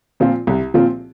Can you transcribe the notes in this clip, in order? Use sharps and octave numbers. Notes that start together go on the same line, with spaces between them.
A#2 F3 C4 F4
C2
A#2 F3 C4 F4